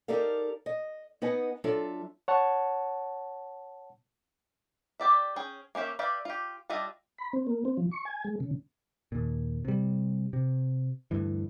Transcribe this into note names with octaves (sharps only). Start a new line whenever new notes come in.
D#4 G4 A4 A#4 D5 F5
D#5
B3 D#4 B4 D#5 F#5 G#5
F#3 D4 F4 A4 E5
C#5 F#5 A5
G4 D5 E5
C#4 G#4 G5
A#3 C#4 G4 E5
G4 B4 D5 E5 F5
F4 G4
G3 D4 F4 D#5 E5
B5
C4
A#3
C4
F3
C#6
G#5
G#3
C#3
D#2 A#2
C3 G3
C3
D2 G2 E3